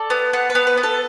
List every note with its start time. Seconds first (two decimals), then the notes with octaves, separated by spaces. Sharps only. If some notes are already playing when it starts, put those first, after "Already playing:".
Already playing: A4 D5
0.10 B3
0.33 B3 F#5
0.50 B4
0.55 B3
0.67 B4
0.77 B3
0.83 A4